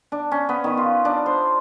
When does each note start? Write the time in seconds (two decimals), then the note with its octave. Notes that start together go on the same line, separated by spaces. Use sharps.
0.12 D4
0.31 C#4
0.49 B3
0.64 D#3
0.77 F4
1.05 D4
1.26 C5